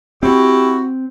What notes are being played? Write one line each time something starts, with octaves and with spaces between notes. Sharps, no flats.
C4 E4 F#4 G4